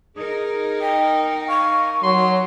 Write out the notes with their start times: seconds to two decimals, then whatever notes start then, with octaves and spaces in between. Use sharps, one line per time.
0.16 D#4 G#4 A#4
0.81 D#5 G5
1.48 F5 C#6
2.03 F#3 C6